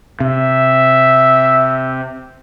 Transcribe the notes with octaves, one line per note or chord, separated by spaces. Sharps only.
C3 E5